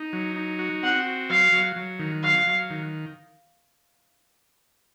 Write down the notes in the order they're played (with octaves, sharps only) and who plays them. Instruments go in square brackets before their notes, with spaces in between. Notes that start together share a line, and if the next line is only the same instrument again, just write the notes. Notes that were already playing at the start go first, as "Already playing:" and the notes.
Already playing: [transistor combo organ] D#4
F#3
D#4
F#4
[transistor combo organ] C4 [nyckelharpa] F#5
[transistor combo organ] F#4
[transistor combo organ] F#3 [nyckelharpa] F5
[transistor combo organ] F#3
F#3
D#3
[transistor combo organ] F#3 [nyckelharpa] F5
[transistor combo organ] F#3
D#3